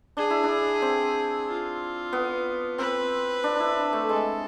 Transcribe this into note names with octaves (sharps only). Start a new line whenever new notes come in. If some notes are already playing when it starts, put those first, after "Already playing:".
D4 G#4
E4
D4
C4
F4
B3
C4 B4
D4
D4 E4
A3
G#3 A4